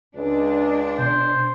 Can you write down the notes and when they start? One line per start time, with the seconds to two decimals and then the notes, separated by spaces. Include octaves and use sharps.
0.15 C#2 D4
0.98 B2 C5